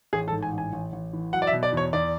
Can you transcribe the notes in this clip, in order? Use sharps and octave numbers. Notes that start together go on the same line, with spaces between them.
A1 G#4
A4
G#2
G#5
A1
G#5
A1
A1
E3
F#3 F#5
D5
E5
B2
D5
E2
C#5
E2 D5